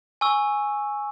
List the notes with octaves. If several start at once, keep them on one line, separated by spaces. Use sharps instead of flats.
G#5 C#6 E6